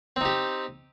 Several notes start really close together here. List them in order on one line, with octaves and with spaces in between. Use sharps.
C4 D#4 G4